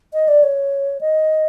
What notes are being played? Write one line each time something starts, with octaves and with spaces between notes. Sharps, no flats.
D#5
D5
C#5
D#5